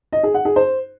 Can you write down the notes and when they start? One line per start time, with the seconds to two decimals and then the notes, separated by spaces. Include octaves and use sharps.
0.13 D#5
0.23 G#4
0.34 F#5
0.45 G#4
0.56 C5